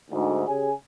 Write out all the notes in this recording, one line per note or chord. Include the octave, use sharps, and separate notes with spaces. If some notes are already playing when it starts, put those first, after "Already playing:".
D2 G#2
C#3 G4 G#4 C#5 G#5